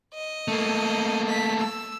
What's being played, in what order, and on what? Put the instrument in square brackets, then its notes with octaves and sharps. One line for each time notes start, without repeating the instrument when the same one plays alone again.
[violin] D#5
[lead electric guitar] A3 A#3
[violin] B6
E6